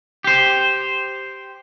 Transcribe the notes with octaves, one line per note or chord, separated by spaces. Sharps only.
G4 C5